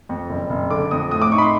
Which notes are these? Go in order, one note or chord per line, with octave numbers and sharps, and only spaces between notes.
F2
F#1
F#1
D3 D6
F2 D#6
A2 D#6
D6
D#4 C#6
B5
C6